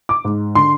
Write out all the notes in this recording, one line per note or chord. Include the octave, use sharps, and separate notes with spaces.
D6
G#2
D3 C6